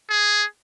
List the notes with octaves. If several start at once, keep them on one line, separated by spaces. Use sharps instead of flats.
G#4